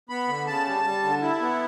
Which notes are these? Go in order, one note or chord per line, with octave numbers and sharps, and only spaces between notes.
B3 B5
D3
C#3 A5
G3
G3
D3
E4
B3